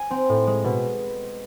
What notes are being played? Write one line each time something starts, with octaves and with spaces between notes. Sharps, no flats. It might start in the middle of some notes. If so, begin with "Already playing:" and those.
Already playing: G#5
C4
A2
G#3
B2